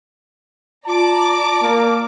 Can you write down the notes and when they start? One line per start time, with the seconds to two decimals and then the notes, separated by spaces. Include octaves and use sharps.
0.86 F4 D5 A5 A#5 D6
1.62 A#3 A5